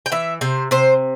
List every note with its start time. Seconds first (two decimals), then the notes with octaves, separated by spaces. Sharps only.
0.06 G5
0.12 E3 E5
0.41 C3 C5
0.71 C3 C5